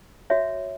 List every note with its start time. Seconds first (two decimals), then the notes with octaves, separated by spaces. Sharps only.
0.30 F#4 C#5 E5